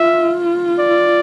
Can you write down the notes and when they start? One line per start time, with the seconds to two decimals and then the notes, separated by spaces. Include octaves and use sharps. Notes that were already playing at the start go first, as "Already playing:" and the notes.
Already playing: F4 E5
0.79 D5